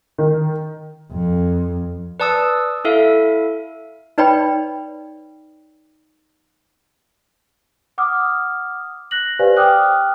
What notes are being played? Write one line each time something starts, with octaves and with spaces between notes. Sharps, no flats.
D#3
F2
B4 D5 A5 D#6 E6
E4 A4 E5 F5
D#4 B4 C#5 D5 G5 B5
F#5 D6 D#6 F6
F#6 A#6 F#7
G4 B4 C5 D5 F5 G#5
G5 D6 D#6 F6 F#6